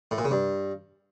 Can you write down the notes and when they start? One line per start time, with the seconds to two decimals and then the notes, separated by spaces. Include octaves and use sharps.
0.11 A2
0.18 A#2
0.25 C#3
0.31 G2